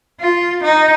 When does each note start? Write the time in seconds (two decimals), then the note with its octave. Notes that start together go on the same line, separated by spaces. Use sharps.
0.20 F4
0.63 D#4